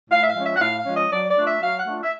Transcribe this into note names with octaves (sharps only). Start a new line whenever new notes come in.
A2 F5
E5
F5
F3 G#3 C#4
E5
F#5
A2 F5
F5
F3 G#3 C#4
D#5
F#3 D5
D5
A3 D4 F4
E5
F#3 F5
F#5
A3 D4 F4
E5